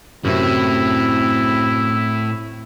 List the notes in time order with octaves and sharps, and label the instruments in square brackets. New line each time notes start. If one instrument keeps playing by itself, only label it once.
[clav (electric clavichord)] F#2 C3 [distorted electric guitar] A2 [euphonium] C4 [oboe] E4